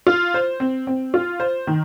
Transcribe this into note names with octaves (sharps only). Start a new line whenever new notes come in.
F4
C5
C4
C4
F4
C5
D#3